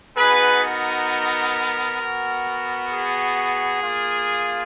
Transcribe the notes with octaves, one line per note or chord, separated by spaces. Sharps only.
B3 D#4 F#4 G#4 B4
A#4
B3 F#4
G#4
A#3 F4